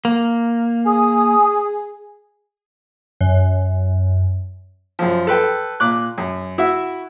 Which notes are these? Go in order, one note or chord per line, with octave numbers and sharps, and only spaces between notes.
A#3
G#4 G#5 D#6
F#2
F#2 F3
A4 B4 G5
A#2 D6 F#6
F#2
E4 F#4 E5